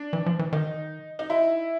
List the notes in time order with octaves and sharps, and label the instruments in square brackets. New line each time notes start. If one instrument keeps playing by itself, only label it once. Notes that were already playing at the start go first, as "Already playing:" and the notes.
Already playing: [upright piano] D4
[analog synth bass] E3
F3
E3
[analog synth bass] D#3 [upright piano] D#4
[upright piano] D#4
E4